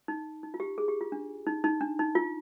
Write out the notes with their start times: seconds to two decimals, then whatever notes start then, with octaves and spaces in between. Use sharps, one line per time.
0.08 D#4
0.43 D#4
0.54 F4
0.60 G4
0.78 G#4
0.88 G4
1.01 F4
1.12 D4
1.47 D#4
1.64 D#4
1.81 D4
1.99 D#4
2.15 F4